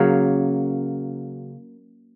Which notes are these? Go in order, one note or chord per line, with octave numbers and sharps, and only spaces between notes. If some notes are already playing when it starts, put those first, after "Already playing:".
Already playing: C#3 F#3 A#3